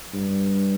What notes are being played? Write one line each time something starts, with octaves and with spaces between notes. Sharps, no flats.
G2